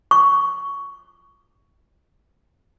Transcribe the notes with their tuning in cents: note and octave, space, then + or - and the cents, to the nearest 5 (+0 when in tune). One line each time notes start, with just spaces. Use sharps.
C#6 +10